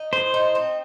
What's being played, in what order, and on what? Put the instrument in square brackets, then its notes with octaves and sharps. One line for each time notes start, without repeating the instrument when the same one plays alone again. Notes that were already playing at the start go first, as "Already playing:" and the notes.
Already playing: [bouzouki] D#4
[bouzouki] A2 [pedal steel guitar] C5
[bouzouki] D#4
C4